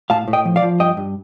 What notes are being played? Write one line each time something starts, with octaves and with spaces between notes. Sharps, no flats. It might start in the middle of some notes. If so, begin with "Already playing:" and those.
A2 F5 A5
A2
D#5 G5
F3
D5 F5
F3
G2 D#5 G5
G2